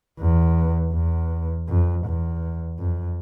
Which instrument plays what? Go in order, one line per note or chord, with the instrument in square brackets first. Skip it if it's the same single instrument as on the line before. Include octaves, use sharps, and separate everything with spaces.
[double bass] E2
E2
F2
E2
F2